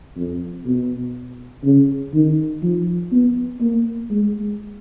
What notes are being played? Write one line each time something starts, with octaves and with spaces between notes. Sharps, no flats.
F2
B2
C#3
D#3
F3
B3
A#3
G#3